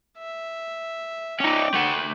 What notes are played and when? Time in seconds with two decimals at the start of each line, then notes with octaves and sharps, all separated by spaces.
0.18 E5
1.40 C#4 D#4 G5 D6
1.74 A3 F#5